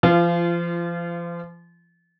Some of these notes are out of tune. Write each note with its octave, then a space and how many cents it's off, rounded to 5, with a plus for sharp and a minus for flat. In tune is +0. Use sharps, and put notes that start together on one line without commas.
F3 -35 F4 -20